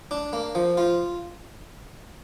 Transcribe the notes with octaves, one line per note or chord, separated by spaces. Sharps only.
D4
A#3
F3
F4